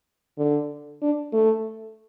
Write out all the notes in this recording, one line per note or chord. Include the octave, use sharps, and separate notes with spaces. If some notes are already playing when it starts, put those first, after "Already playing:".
D3
D4
A3